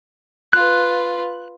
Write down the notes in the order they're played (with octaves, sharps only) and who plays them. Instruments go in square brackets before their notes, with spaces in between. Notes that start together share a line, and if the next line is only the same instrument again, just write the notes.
[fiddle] F4 B4 [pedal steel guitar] F#6